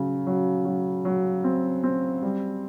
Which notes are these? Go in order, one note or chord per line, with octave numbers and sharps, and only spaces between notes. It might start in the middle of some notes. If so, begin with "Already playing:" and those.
Already playing: C#3 F#3
F#3
F#3
F#3
C4
C4
G3